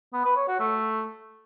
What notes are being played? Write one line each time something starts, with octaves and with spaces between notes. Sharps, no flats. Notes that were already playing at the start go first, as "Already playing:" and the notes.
B3
B4
C#5
F#4
A3